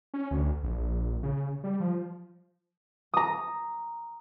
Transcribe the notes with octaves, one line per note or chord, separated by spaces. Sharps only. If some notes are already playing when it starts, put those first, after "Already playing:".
C#4
D2
A#1
C#3
G3
F3
A#5 D#6